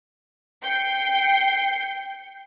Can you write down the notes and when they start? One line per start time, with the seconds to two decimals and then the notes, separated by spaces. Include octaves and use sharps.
0.63 G5 G6 C7 C#7